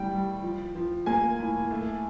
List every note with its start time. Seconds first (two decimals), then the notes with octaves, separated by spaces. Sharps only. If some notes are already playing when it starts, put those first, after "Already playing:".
Already playing: A2 G3 G5
0.11 G3
0.42 F3
0.75 F3
1.06 A#3 G#5
1.39 A2
1.71 A3